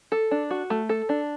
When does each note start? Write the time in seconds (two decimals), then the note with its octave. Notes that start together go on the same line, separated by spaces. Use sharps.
0.12 A4
0.31 D4
0.51 F#4
0.70 A3
0.89 A4
1.09 D4